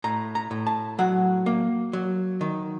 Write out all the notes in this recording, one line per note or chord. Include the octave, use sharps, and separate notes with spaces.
A2 A#5
A#5
A2
A5
F#3 F#5
A#3
F#3
D#3